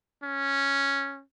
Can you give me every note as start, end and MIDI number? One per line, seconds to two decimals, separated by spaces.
0.23 1.23 61